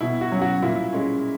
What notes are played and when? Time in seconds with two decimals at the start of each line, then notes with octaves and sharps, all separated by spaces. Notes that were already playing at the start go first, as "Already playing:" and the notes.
0.01 B2 E4
0.21 F#4
0.32 F#3 C#4
0.41 F#4
0.62 A#2 E4
0.93 G#3 C#4